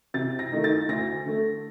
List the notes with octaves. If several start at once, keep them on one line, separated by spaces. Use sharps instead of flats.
C3 A6
A#6
D#3 A3 D#4
A6
D2 A#6
D3 A3